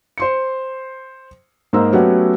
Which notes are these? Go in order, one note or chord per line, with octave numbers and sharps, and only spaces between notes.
C5 C6 C#7
G#2 A#3 C5 D#5 A#5 E6
F#3 A3 B3 C#4 G4 F#5